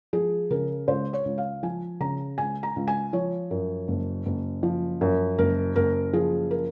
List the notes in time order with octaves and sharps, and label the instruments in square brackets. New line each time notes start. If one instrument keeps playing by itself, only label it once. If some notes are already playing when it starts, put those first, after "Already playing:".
[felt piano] F3 G#4
C#3 A#4
C#2 C5
C#5
C#2
F5
F3 G#5
C#3 A#5
C#2 G#5
A#5
C#2
G#5
F3 C#5
F#2
F#1
F#1
F3
F#2
F#1 A#4
F#1 A#4
F3 G#4
A#4